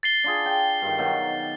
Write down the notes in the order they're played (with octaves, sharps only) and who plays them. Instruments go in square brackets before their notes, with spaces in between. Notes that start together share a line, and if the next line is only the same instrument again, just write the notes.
[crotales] A6 C7 G7
[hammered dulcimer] D4 F4 G#4
G5
G2 D#3
B2 D#3 F#3